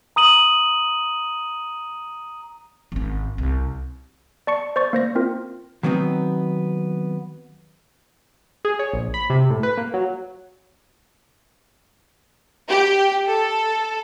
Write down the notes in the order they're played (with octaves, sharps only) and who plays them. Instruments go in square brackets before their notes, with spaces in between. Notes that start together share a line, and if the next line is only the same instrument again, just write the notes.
[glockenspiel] A#5 D#6 D#7 F#7
[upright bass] G#1 C#4
C2
[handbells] D5 A5 C#6 C#7
C5 D5 C#6 A6
A#3 C5 A#6
C4 F4 A#4
[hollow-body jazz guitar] D#3 F#3 B3 C4 D#4
[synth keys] G#4
C#5
A#1
B5
C3
A2
B4
A#3
F#3
[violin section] G4
A4